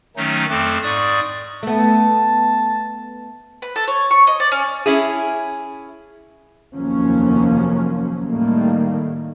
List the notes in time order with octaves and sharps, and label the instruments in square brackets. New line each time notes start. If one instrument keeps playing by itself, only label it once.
[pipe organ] D#3 F#3 A3 C#4 D#4
F2 A3 C4 A4 D6 F#6
G#2 D5 C#6 D#6
[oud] A3 B3 [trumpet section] A5
[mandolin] B4
A4
C#5
C#6
D#5
D5
C#4
[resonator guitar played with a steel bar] C#4 E4 G#4
[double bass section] F1 D#2 F3 F#3 A#3 C#4
A2 D#3 G3 A3 A#3